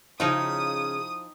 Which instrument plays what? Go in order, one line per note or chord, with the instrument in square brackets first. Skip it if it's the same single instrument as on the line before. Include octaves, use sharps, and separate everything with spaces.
[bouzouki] C#3 [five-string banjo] F3 E4 D#5 [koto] D#4 G5 [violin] D#6